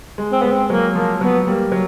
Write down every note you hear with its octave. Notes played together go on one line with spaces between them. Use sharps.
G#3
C4
G#3 B3
C4
F#3 A#3
F3 A#3
F#3 B3
G3 A#3
F#3